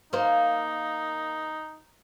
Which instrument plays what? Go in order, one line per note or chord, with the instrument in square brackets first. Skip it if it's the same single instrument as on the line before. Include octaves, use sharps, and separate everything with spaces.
[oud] A#3 C5 [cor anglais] D#4